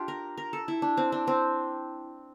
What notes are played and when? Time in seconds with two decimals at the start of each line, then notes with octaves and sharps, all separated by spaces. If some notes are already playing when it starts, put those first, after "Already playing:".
Already playing: D4 F4 G4
0.08 A#4
0.38 A#4
0.53 A4
0.68 E4
0.82 D4
0.97 C4
1.12 D4
1.27 C4